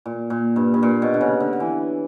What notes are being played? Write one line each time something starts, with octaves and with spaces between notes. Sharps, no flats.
A#2
A#2
G2
G2
A#2
B2
D3
C#3
D3
D3
E3